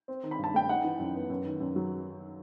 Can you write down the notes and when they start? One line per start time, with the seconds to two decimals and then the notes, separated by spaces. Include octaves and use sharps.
0.08 C4
0.23 D#3
0.31 B5
0.38 G2
0.44 A5
0.54 A3 G5
0.69 D#4 F#5
0.84 E3
1.00 F#2
1.15 B3
1.30 F#2
1.45 D#3
1.60 F#2
1.76 F#3